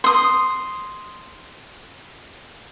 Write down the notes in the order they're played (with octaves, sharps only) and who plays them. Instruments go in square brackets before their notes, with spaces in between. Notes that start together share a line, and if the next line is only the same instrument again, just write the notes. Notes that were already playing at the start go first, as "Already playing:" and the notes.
[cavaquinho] C6 D#6